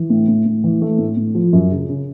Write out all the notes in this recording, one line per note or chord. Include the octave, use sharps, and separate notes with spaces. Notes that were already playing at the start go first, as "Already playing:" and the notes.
Already playing: E3
A2
A2
A2
E3
A3
A2
A2
F3
F#2
C#3
C#3